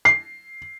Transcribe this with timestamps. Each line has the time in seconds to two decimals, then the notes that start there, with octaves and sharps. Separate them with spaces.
0.05 C7